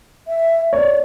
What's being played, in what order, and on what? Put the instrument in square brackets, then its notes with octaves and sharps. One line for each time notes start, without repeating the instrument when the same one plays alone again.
[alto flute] E5
[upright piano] C#5 [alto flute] D5